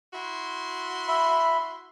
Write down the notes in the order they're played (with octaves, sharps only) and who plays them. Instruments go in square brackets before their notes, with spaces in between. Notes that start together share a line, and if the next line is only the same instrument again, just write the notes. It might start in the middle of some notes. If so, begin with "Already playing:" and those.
[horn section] E4 F#4 C6
[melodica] E5 B5